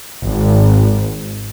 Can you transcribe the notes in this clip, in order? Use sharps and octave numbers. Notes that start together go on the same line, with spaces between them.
G#1